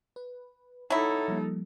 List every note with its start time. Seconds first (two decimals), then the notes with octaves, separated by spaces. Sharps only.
0.16 B4
0.90 F#3 D#4 E4 A4 G5
1.28 F3 G3 A#3